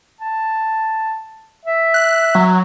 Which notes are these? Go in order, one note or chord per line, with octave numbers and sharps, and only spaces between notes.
A5
E5
F#6
F#3